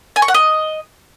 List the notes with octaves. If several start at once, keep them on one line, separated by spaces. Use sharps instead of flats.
G#5
C#6
F#5
D#5